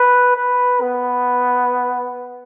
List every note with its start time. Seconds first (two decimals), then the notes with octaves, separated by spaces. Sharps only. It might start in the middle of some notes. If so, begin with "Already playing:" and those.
Already playing: B4
0.36 B4
0.81 B3